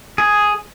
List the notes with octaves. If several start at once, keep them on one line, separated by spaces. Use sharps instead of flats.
G#4